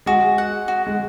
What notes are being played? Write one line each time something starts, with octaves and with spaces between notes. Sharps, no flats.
G#3 F#4 G#4
F#5
F#4
G#3